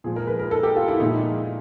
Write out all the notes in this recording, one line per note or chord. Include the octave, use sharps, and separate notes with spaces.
A#2 F3 G#3 G#4
A#4
B4
A#4
A4
G4
F4
E4
A#2 F3 G#3 D#4